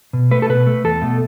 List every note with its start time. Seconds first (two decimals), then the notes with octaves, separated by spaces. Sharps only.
0.13 B2
0.31 A3 B4
0.42 A4
0.49 B2 B4
0.67 A3
0.84 E2 A4
1.02 B2 A3